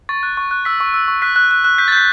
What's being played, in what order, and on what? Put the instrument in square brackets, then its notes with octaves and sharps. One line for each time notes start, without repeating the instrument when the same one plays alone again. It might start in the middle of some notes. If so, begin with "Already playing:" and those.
[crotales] C#6 A6
F#6
C#6
F#6
E6 B6
C#6
E6
C#6
F#6 B6
F#6
F#6
F#6
G6 B6
A6
G6 B6